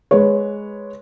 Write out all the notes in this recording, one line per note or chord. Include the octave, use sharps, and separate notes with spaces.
G#3 B4 C#5